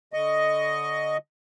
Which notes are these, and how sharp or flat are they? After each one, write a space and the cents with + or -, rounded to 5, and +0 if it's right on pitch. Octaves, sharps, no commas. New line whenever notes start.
D3 -20 D#5 +0 C#6 +10